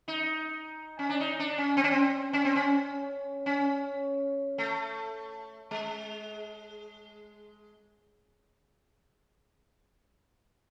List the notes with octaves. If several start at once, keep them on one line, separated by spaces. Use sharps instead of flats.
D#4
C#4
D4
D#4
D4
C#4
C4
C#4
C4
C#4
C4
C#4
C#4
A3
G#3